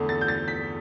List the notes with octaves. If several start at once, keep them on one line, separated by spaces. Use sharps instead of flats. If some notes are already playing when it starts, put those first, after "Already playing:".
Already playing: E2 D3 A3
A6
G6
A6
B6